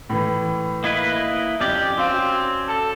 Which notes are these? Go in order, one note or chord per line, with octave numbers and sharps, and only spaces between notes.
A2 E3
A#3 E4 B4 D#5
F2 C#4 G4 D5
C4 F#4 F5 D7
A4